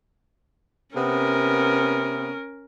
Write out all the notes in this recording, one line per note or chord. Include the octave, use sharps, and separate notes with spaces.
C3 B3 C#4 A#4